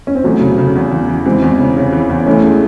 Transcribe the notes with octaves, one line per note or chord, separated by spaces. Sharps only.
C#4
C4
E2 F#3 A3
C#3
C#3
E2
E2
E3
E3 G#3 C4
E2
C#3
C#3
E3
E2
E3 A3 C#4
G#3